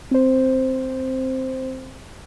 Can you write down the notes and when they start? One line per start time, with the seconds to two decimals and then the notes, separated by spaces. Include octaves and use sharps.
0.11 C4 C5